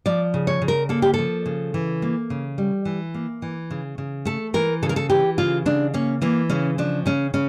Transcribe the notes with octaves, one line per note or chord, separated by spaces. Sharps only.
F3 D5
C#3
C#5
C#3
A#4
A#3 A4
G4
F3 A4
C#3
E3
A#3
C#3
G3
E3
A#3
E3
C#3
C#3
A3 A4
E3 A#4
C#3 A4
A#4
A4
E3 G4
C#3 F4
C#3 D4
A#3 C#4
E3 A#3
C#3 C#4
F3 D4
C#3 C#4
C#3 C#4